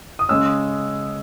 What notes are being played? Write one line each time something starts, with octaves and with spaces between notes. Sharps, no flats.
D#6
C#3 G#3 C#4 E6